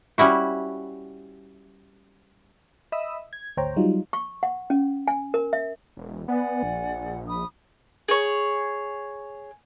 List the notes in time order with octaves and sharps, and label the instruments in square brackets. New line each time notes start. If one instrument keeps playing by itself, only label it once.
[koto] G3 C#4 E4 F#4
[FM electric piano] D#5 E5 B5 D#6 E6
G#6
G#1 D2 C5 C#5 G5 A#5
F#3 G3 D#4 F4
[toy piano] C#6
F#5
C#4
G#5
A#4
E5
[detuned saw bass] E1
[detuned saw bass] B3 [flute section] D5 F#5 G#5
[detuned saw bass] A#1
[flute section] B5 D#6
[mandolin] G#4 C#5